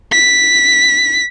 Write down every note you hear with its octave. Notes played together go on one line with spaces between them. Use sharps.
B6